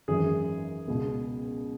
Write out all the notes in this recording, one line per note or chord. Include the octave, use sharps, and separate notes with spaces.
G#1 F#2 E3 G#4
C#2 B2